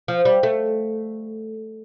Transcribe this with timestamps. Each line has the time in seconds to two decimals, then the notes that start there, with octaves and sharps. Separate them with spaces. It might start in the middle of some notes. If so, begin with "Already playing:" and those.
0.08 F3
0.25 G3
0.43 A3